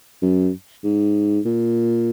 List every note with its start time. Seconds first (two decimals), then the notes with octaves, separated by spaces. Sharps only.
0.22 F#2
0.84 G#2
1.45 A#2